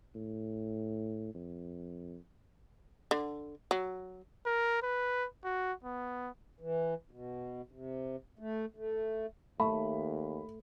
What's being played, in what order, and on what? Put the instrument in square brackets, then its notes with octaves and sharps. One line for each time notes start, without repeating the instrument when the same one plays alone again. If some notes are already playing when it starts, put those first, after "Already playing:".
[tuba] A2
F2
[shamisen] D3
F#3
[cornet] A#4
B4
F#4
B3
[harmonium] E3
B2
C3
A3
A3
[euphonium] D#2 [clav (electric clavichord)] A3 [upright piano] B5